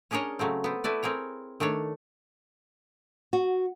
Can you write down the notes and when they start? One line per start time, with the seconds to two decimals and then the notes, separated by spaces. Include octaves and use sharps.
0.11 C#4 D4 G#4 A#4 C#5 D#5
0.39 C#3 F#3 A3 C4
0.64 B3 C4
0.84 A3 E4 B4 D5
1.03 C4 G#4 A#4 C#5
1.60 D#3 A3 D4 C#5
3.33 F#4